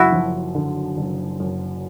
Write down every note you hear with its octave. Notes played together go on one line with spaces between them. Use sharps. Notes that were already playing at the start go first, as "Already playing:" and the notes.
Already playing: F#1 F#2 E4 F#4
F3
D3
F#1
F#2